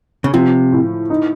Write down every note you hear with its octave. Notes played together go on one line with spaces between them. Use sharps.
C#3
C3 F3
A2
D#4